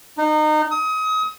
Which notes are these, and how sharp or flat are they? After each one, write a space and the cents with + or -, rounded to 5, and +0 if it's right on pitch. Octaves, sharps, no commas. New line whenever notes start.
D#4 -25
D#6 +30